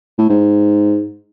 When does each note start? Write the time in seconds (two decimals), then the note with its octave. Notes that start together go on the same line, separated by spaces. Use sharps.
0.18 A2
0.30 G#2